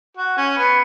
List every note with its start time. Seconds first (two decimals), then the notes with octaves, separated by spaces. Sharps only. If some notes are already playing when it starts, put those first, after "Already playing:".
0.17 F#4
0.37 C#4
0.57 B3